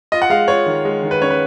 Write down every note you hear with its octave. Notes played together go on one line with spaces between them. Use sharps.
F4 D#5
F#5
G#3 F5
F4 C#5
D#3
G#3
D#3
B4
C#4 C#5
B4